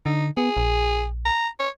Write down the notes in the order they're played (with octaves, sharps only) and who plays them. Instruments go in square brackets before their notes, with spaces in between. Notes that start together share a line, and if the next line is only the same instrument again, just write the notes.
[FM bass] D3 [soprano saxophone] D#4
[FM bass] B3 [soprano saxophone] G#4
[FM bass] A#1
[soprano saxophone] A#5
C#5